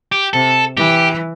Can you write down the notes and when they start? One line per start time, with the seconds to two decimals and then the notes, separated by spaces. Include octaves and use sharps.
0.12 G4
0.33 C3 A4
0.77 E3 G4